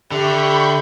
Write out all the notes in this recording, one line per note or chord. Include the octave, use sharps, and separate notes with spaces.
D3 G4 D5 E5 G5 B5 C#6 G6